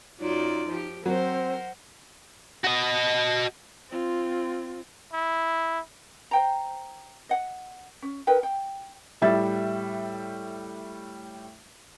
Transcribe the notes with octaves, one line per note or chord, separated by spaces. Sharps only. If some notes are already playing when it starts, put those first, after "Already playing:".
F#2 F#3 D#4 F4 D5
F3 G4
F#3 C4 A#4 C5 F#5
F#4 D#5
C4 F4
E4
C5 G5 A#5
D#5 F#5
C#4
D#4 A#4 B4 G5
G5
A2 G3 E5 A6